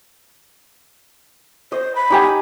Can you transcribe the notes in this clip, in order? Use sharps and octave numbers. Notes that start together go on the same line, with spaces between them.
C5 D#5
B5
D#4 G4 G#5